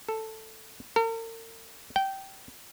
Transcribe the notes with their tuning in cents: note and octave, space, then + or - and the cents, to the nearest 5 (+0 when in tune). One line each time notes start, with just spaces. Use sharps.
A4 +5
A#4 -45
G5 -20